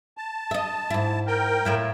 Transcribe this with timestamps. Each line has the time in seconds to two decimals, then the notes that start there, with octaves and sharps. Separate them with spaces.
0.17 A5
0.51 D#5 E5
0.90 G#2 E4
1.27 A#4 G5
1.65 A2 E4 F4